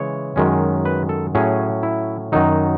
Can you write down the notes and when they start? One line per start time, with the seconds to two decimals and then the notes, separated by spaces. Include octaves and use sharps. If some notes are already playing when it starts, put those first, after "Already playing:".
Already playing: C#3 E3 G#3 C#5
0.36 F#2 D#3 G#3 C#4
0.85 B4
1.09 A4
1.35 A2 F#3 C#4 G#4
1.83 E4
2.32 F#2 D#3 F#3 D#4